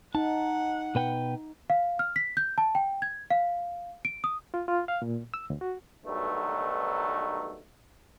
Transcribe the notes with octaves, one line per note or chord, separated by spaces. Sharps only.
D#4 F#5 A5
B2 B4 G5
F5
F6
B6
G6
A5
G5
G#6
F5
D7
D#6
F4
F4
F5
A#2
E6
D2
F#4
B1 G2 D#3 F#3 A3